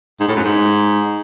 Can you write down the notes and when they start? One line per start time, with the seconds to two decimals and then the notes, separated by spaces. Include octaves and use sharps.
0.20 G#2
0.28 A2
0.36 F#2
0.44 G#2